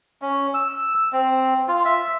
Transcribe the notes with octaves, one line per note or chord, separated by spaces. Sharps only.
C#4
E6
C4
F4
E5